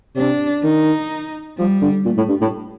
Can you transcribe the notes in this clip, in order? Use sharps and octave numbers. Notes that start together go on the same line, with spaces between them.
C3 D4
D#3 D#4
F3 G3
D3
A#2 A3
A2
G2
A2